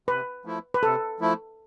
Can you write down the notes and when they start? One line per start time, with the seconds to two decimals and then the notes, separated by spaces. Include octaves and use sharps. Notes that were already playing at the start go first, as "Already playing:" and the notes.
0.08 C3 B4
0.45 F3 A3 E4
0.74 B4
0.83 C3 A4
1.20 F3 A3 E4